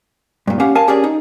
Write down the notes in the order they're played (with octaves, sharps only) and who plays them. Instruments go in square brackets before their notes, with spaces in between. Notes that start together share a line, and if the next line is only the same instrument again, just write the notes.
[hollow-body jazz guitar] G2 A#2
C#4 G4 F5 F#5
A#4 F5 G#5 A5
C#4 G4 G#4 A#4 D5
D#4